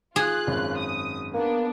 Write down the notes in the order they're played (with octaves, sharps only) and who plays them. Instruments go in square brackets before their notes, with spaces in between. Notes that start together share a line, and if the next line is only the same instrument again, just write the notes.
[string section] F4 F#6 [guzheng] G#4
[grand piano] G#1 F#2
[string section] D#6
[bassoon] A#3 [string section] B3 D4